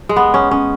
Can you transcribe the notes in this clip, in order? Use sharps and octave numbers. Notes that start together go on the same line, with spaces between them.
G#3
B3
C#4
C#4